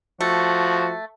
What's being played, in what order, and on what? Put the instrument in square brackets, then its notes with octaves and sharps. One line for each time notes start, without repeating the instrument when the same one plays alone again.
[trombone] F3 [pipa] A3 [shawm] F#4